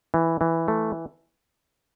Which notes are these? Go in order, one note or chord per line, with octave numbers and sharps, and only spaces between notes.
E3
E3
A3